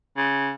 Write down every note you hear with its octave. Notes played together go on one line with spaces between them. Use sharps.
C#3